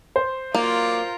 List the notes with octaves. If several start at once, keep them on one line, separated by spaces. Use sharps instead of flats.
C5
F#3 A#3 F4 A#4 D5